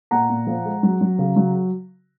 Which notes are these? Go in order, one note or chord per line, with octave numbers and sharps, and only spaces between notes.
A#2 F#5 A#5
A#2
F3
G#3
F#3
F#3
C#3
F#3